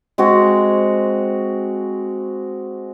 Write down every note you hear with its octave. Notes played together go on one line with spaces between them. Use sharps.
G#3 C4 F#4